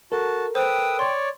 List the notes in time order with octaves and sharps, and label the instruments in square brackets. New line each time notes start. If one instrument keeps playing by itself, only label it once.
[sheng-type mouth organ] F#4 A5 [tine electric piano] A4 A#4
[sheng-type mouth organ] B4 D#6 E6 [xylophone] C5 [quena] G5
[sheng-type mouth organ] C#5 D5 [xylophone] C6